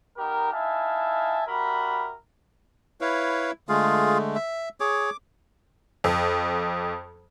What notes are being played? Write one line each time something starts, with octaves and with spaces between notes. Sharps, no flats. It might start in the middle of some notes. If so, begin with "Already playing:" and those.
B3 D#4 G4 A#4
D#4 E4 E5 F5 G#5 A5
G3 F#4 A#4 E5 B5
E4 B4 C#5 F5
D3 G#3 A3 F4 G#4 F5
E5
G#4 C#5 D6
F2